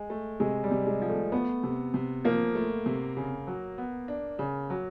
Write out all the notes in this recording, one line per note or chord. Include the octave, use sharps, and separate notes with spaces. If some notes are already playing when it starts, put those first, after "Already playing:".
Already playing: G#3
A3
C3 G#3
G3
C3
G#3
F3
A3
A3 B3
C3
C3
F3 A#3
A3
C3
C#3
F#3
B3
D4
C#3
F#3